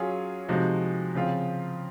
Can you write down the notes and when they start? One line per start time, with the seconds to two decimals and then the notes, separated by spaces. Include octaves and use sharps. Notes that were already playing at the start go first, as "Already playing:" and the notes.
Already playing: F#3 C#4 F4 G#4
0.48 C3 F3 G#3 D#4 F#4
1.15 C#3 F3 C4 F4